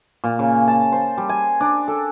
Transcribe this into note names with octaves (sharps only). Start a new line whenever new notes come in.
A#2
C#3
A5
C5
G3
G#5
D4
A4